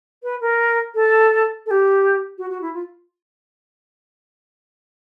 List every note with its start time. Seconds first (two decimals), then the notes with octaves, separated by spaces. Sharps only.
0.23 B4
0.41 A#4
0.94 A4
1.66 A4
1.70 G4
2.38 F#4
2.49 F#4
2.61 E4
2.73 F4